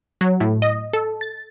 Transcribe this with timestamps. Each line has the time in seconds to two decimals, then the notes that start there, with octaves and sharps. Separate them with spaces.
0.21 F#3
0.40 A2
0.62 D#5
0.93 A4
1.21 A6